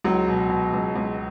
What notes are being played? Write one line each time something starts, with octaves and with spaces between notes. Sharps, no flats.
C#2 F#3
B2
B2
C#2
C#2